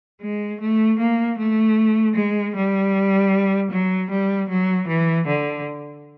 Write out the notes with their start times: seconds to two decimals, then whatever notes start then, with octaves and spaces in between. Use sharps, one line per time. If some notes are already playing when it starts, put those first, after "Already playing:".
0.21 G#3
0.60 A3
0.99 A#3
1.38 A3
2.15 G#3
2.54 G3
3.71 F#3
4.10 G3
4.49 F#3
4.88 E3
5.27 D3